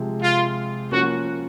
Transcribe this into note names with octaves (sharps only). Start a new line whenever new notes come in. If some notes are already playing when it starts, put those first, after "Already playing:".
Already playing: C3 F3 G#3
F4
F3 A#3 C#4 F#4